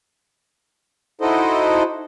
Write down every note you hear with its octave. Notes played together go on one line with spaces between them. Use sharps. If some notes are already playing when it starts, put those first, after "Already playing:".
D#4 E4 F#4 A4 C5 D#5